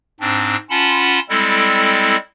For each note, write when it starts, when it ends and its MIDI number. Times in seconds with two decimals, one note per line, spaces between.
0.20 0.56 44
0.20 0.56 60
0.20 0.56 62
0.70 1.20 61
0.70 1.20 65
0.70 1.20 78
0.70 1.20 81
0.70 1.20 83
0.70 1.20 84
1.29 2.16 55
1.29 2.16 56
1.29 2.16 60
1.29 2.16 64
1.29 2.16 69